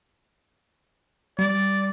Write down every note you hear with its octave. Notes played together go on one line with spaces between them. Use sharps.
G3 D5